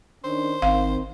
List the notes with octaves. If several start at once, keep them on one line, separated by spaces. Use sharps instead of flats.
D#3 C#4 D4 C5
G#1 D#3 C4 F5